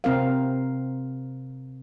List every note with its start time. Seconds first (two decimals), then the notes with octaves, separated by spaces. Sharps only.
0.04 C3 C4 A#4 F5